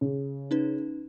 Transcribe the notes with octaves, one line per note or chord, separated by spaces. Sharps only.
C#3
C#4 D#4 B4